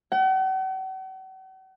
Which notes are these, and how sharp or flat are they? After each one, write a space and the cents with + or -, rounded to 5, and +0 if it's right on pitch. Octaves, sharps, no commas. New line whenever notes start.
F#5 +45